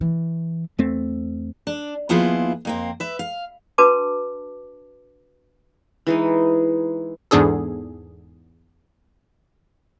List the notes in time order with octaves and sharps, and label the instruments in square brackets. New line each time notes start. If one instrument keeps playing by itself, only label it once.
[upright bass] E3
[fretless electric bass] E2 A3 C4
[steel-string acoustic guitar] D4
D#2 F3 B3 E4 F4 G#4
F2 A#3 C4
B4 E5
F5
[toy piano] D4 F#4 B4 A5 D6
[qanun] E3 G#3 D#4
[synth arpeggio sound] E2 G#2 D4 G#4 A4